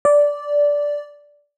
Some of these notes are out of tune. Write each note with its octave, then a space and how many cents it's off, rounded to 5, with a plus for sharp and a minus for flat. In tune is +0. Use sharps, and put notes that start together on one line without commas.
D5 -10